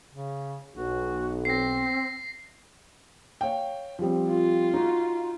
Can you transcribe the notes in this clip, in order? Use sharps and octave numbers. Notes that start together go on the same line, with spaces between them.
C#3
B1 F#4
C4 A#6 C7
C#5 F5 G5
F3 G3 C4
F4
D#4 F#4